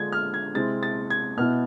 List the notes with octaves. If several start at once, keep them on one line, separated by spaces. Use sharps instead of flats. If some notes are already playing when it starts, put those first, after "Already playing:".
Already playing: D3 G#3 D4 F4 G#6
F6
G#6
C3 G#3 C4 E4 A6
A6
G#6
B2 B3 E4 F6